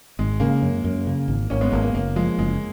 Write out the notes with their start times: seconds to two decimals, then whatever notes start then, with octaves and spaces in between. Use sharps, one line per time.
0.19 G#1 G#3
0.40 C#3 A#3
0.62 F#2
0.84 F#2
1.07 C#3
1.28 G#1
1.50 G#1 A#3 C#4
1.61 G#3 B3
1.72 G#1 A#3
1.83 A#3
1.95 F#1 A#3
2.16 F3 G#3
2.38 F#1 G#3